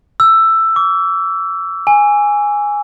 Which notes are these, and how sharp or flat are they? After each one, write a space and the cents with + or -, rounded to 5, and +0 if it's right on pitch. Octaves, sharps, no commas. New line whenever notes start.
E6 +10
D6 -40
G#5 -5